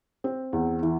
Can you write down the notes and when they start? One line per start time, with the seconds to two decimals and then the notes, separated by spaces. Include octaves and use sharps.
0.24 C4
0.53 E2
0.83 E3